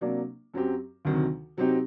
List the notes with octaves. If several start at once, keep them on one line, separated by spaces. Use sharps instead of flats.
C3 F#3 A#3 D4
F#2 F#3 C4 G4
D2 C3 D#3 F#3
C3 F#3 C4 D#4 G4